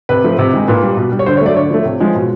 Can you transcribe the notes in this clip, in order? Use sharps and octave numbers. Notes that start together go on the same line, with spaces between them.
C3 B4
F3 A3
C3
D#3 G#3
A#2 B4
G3
B2
G3
C#5
D3 C5
C#5
F#3 A3 D5
D3 C#5
F3 A3
C3
F3 G#3
B2